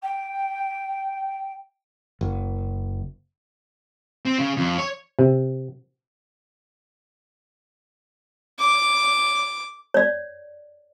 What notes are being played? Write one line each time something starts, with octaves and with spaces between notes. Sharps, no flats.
G5
F#1
C4
C#3
F2
C#5
C3
D6
C#5 D5